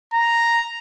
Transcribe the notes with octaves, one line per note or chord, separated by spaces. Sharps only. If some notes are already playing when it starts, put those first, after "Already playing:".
A#5